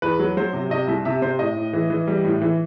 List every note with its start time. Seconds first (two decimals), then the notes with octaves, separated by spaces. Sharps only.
0.02 E2 B4
0.19 F#3
0.37 F#3 C5
0.53 C3
0.70 C3 D#5
0.87 C2 E5
1.05 C3 E5
1.22 C3 C5
1.39 A2 D#5
1.57 A2
1.73 E3
1.90 E3
2.07 G3
2.24 A2
2.42 E3